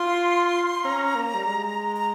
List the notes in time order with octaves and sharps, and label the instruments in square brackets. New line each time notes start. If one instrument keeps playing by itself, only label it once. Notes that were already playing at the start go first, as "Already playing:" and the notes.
Already playing: [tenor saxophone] F4 [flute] C6
[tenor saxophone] C#4 [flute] A#5
[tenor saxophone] A#3
G3
G#3
[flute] A#5